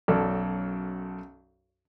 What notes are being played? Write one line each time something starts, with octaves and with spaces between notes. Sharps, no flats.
B1 F#2 A4 D5